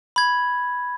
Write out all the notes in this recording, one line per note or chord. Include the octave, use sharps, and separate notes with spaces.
B5 G#6